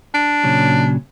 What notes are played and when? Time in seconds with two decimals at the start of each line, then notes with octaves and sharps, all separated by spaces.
0.15 D4
0.44 A#2 C#3 F#3